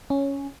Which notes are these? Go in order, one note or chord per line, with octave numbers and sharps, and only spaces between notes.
C#4